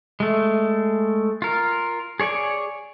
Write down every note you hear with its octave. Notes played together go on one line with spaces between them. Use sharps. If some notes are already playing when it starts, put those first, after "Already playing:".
G#3 A3
F4 A#4
G#4 C#5 D5 G#5